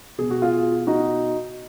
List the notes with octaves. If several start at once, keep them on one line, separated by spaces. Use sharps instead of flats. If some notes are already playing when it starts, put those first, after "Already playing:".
B2 G#4
F#4
F4 G#4
D#4 F#4